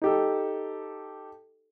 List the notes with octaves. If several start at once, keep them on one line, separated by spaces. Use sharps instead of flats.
D#4 G4 A4